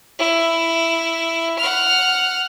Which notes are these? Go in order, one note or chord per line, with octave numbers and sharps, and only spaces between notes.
E4
F#5 F6